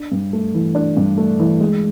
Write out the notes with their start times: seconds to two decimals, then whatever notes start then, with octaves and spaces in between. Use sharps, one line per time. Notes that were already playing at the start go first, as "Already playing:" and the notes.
Already playing: D4
0.12 G2
0.33 A3
0.54 E3
0.75 D4
0.97 G2
1.17 A3
1.40 E3
1.60 G#3